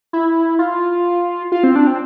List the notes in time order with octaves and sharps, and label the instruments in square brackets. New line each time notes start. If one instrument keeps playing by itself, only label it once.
[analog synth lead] E4
F4
F4
C4
D4
C4